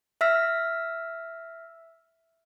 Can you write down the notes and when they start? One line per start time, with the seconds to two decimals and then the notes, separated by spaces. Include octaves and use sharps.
0.21 E5 E6 F6 B6